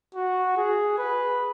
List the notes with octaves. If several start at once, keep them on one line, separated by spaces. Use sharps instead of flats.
F#4
G#4
B4